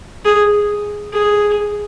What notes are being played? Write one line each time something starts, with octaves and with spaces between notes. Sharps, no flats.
G#4
G#4